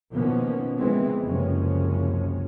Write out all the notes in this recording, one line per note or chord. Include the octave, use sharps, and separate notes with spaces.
B2 D#3 F3 A#3 B3 C#4
E3 F3 G#3 B3 C4
F#1 C#2 F#2 C3 F3 C#4